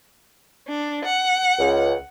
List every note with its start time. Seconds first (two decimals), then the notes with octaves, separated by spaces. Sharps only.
0.68 D4
1.05 F#5
1.59 C#2